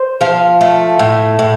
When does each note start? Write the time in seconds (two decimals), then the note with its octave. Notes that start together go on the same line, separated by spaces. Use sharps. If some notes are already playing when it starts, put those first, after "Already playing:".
Already playing: C5
0.21 F3 F5
0.61 A3
0.99 A2
1.39 A2